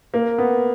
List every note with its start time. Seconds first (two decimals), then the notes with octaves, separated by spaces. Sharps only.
0.14 A#3
0.38 B3